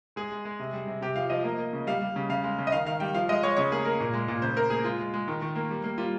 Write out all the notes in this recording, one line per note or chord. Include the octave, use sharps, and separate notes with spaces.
G#3 G#4
G#3
G#3
C3
G3
C3
C3 G4
F3 F5
F3 D#5
A#3
A#3
C#3
G3 F5
G3
C#3
C#3 F5
G#3
C#3
D#5
D#3 F5
D#3 F5
G3 G5
F3 F5
G#3 D#5
G#3 C#5
C#3 C#5
A#3 G#4
A#3 A#4
A#2
G#3
A#2
C#3 C5
A#3 A#4
A#3 G#4
G#3 F4
G#3
G#3
D#3
D#3
A#3
G3
A#3
G3 F4